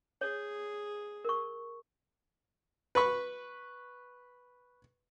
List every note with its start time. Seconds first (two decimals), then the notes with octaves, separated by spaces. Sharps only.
0.21 G#4 C#5
1.25 A#4 C#6
2.95 B4 B5 C#6